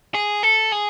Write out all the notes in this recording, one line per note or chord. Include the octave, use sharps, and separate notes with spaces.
G#4
A4
G#4